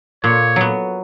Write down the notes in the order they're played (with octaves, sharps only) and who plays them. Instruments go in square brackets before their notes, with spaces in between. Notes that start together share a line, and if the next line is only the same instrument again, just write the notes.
[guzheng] A#2 [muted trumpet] C#5
[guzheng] F#3 B3